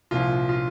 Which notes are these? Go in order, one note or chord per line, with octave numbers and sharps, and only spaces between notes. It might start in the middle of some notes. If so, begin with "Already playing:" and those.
C2 A#2 F3 F4
F4